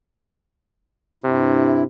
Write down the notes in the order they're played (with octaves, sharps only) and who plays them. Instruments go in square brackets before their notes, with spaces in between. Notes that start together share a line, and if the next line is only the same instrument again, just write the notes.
[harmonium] G2 E4 [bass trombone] C3